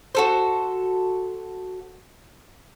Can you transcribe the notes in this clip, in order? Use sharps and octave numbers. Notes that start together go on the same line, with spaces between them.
F#4 A4 C5